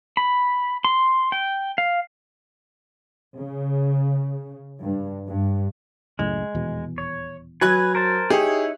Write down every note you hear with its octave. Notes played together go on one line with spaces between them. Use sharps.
B5
C6
G5
F5
C#3
G2
G2
C#2 F#2 A2 G#3
D#1 E2 B2
C#5
F#3 B4 G#5 F#6 G#6
A#4 C5 A5
D#4 E4 G4 G#4 C#5